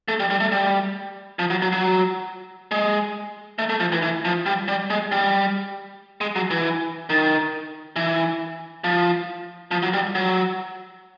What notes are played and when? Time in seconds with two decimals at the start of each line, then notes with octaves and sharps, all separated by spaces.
0.08 A3
0.20 G3
0.30 G3
0.40 A3
0.52 G3
1.39 F3
1.50 F#3
1.62 F#3
1.72 F#3
2.71 G#3
3.59 A3
3.70 A3
3.80 F3
3.92 E3
4.02 E3
4.25 F3
4.46 G3
4.68 G3
4.90 G#3
5.12 G3
6.21 G#3
6.36 F#3
6.51 E3
7.10 D#3
7.96 E3
8.84 F3
9.71 F3
9.83 F#3
9.94 G3
10.15 F#3